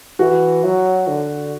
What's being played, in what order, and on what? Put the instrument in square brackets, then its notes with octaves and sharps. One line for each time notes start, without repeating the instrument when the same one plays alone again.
[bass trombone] E3 [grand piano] F#4
[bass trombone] F#3
D3